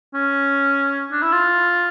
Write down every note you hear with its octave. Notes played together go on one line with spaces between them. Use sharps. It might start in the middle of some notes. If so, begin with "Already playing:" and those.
C#4
D4
E4
F4